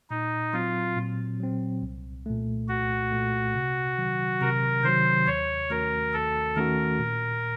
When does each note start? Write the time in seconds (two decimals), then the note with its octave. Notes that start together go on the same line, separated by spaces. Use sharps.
0.10 A#2 D#4
0.53 F#3 C4 F4
0.97 A#2
1.40 F#3 C4
1.82 C2
2.26 A#2 A3
2.68 C2 F#4
3.11 A#2 A3
3.55 C3
3.98 D#3 F#3
4.41 C3 A#4
4.84 D#3 F#3 C5
5.27 D#2 C#5
5.70 D#3 A3 C#4 F#4 A#4
6.13 D#2 A4
6.56 D#3 A3 C#4 F#4 A#4
6.99 A#2